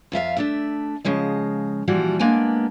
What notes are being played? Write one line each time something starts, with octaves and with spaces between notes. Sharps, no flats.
F2 F4 E5 F5
A3 D4 E5
C#3 F3 G#3 D#5
A#2 E3 F3 G3 F#4
G#3 A#3 B3 D4 G#5